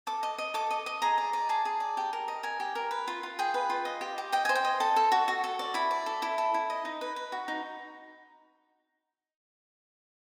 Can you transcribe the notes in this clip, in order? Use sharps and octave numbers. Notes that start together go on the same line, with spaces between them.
A4 D6
D#5
D#5
A4 D6
D#5
D#5
G#4 A#5
D5
D5
G#4 A5
G#4
D5
G4
A#4
D#5
A#4 G#5
G4
A#4
B4
F4
F4
G#4 G5
B4
F4
D#5
G4
G4
D#5 G5
C5 G#5
G5
D#5
A4 A5
A4
F#4
F#4
A4
D5
E4 B5
D5
A4
E4
A4
E4
D#5
D#4
B4
B4
F#4
D#4